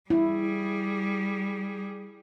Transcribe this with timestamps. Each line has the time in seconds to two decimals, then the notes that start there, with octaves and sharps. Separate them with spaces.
0.10 G3 E4 G#4